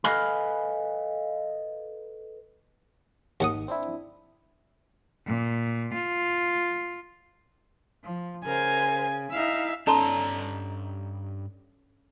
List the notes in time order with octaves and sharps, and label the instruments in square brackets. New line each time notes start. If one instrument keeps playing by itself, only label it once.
[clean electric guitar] A4 B4 D#5 F5 G#5 B5
[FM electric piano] G#1 D#3 [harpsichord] D#2 F#5 D#6
[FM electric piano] C4 D4 E4
[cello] A#2
F4
F3
[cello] C#3 [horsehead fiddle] A#4 C5 [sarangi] G#5
[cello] D#4 E4 [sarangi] E5 [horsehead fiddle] F5
[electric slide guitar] G2 D5 A#5 [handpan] C#4 A4 [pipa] D#4 [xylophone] A5 C6